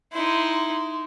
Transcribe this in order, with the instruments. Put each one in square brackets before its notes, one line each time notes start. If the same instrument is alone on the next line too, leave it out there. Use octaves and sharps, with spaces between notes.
[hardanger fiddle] D#4 E4 [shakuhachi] C6